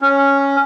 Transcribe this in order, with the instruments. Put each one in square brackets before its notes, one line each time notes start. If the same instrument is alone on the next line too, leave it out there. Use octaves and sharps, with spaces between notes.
[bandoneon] C#4